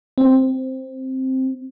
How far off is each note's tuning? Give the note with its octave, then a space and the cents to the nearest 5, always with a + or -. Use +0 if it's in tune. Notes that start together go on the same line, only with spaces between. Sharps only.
C4 +0